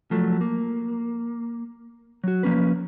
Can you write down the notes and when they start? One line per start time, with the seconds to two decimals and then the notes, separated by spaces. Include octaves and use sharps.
0.11 F3 F#3 A3
0.41 A#3
2.24 F#3 F#4
2.43 F3 A#3 C#4 B4